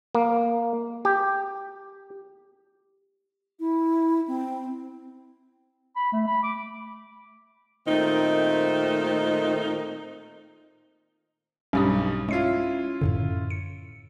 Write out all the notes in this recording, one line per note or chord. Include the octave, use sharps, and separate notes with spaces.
A#3
G4
E4
C4
B5
A3
B5
D6
A#2 D#3 A3 C4 D#4
B1 G2 C#4 G4 D#6
G#3 C#4 E4 F4 C7
F#2 A2 D3
C#7